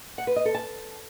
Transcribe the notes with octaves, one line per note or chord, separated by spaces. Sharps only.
F#5
B4
D#5
A4
A5